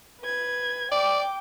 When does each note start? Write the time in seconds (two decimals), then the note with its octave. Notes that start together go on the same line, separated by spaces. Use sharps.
0.21 B4 G#6
0.92 D5 G5 D6